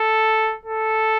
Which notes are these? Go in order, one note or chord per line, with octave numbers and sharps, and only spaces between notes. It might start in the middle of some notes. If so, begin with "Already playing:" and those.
Already playing: A4
A4